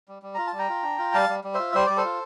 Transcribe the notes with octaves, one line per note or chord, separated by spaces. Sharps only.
G3
G3
F4 A#5
A5
G3
G5 A#5
F4
D4
F4
G3 F5 A5
G3
G3
F4 C5 E5
G3 C5
G3 D5
A4 C5
F4